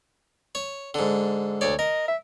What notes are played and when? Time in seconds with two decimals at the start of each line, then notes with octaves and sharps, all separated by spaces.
0.55 C#5
0.94 G#2 D3
1.61 D2 C#5 D5
1.79 A#4 D#5
2.08 E5